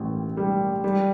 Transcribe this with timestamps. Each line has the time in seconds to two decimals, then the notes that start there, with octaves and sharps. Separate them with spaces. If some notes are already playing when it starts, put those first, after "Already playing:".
Already playing: A1 A2
0.37 G3
0.84 G3